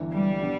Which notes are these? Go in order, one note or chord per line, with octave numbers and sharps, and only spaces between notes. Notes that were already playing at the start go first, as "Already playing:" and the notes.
Already playing: G1 G2 E3
G3
F3 B3 D4